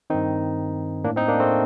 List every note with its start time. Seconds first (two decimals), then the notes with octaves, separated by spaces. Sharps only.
0.10 G2 D#3 C4 D#4
1.04 A2 A#3 D4
1.16 C4 D#4
1.28 A#3 D4
1.40 A3 C4